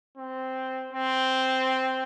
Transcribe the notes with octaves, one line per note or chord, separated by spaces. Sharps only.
C4
C4